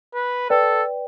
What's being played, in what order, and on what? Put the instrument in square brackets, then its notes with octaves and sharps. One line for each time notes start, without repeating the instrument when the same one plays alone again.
[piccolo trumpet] B4
[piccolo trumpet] A4 [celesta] B4 D5 G5